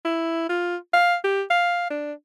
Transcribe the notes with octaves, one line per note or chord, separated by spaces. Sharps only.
E4
F4
F5
G4
F5
D4